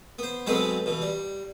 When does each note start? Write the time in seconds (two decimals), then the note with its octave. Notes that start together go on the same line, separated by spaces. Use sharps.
0.19 B3 C5
0.47 B2 F#3 G#3 C4 A4 B4
0.86 B2 E3
1.02 G3